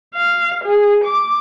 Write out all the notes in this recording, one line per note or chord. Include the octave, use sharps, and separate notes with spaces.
F5
G#4
D6